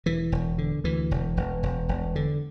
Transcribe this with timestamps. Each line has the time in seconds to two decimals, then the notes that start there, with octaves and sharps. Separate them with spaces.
0.06 E1 E3
0.32 E1
0.58 D3
0.84 D2 E3
1.11 E1
1.37 E1
1.63 E1
1.89 E1
2.16 D3